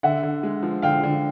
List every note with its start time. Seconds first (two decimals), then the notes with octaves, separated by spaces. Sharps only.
0.03 D3 E5 F#5
0.23 D3
0.43 G#3
0.63 F3
0.82 D3 F5 G5
1.03 D3